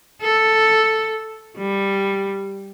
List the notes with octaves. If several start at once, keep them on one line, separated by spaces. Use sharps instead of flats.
A4
G3